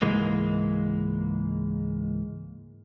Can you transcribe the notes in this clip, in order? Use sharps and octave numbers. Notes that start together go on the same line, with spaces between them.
C#2 G#2 E3 G#3 A#3